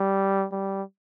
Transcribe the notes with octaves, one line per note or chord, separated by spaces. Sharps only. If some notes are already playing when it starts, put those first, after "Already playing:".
Already playing: G3
G3